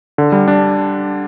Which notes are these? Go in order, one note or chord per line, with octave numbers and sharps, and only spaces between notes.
D3
G3
D4